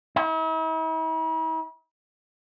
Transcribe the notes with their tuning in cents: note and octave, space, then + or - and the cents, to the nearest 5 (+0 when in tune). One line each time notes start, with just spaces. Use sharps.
E4 -45